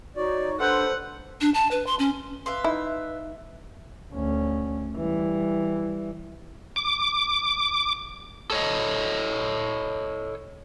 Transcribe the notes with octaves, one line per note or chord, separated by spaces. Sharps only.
D#4 F#4 C#5 D5 C#6
D4 A4 B4 C5 F#5 C6 G6
D4
A5
B4
C6
C#4
B4 E5 F5 C6
D#4 E4
D2 C#4
E3 G3
D6
A4 C#5 D#5